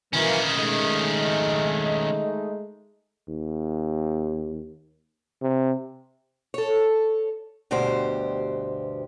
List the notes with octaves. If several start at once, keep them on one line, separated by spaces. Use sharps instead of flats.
D#3 E3 F#3 A#3 C#4
G#3 A3 D#4
D#2
C3
A4 C#5
D2 G2 B2 G4 C5